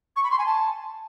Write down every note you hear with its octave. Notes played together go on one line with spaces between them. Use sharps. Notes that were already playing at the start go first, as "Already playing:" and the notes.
C#6
B5
C6
G#5
A5